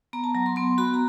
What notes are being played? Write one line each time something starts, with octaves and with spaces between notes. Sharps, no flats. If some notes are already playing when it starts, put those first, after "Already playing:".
B3 A#5
A5
F#3 A#5
C6
B3 C6
F#4 B5
A#5